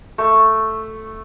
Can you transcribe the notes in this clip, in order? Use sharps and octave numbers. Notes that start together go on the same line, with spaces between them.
A3